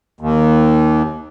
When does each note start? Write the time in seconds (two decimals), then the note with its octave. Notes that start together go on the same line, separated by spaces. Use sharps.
0.21 D#2